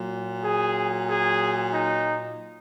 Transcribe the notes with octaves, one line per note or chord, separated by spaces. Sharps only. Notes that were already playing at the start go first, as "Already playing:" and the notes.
Already playing: A#2 F#3
G#4
G#4
D#4